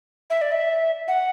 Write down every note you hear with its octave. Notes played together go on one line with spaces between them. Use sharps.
E5
D5
E5
F#5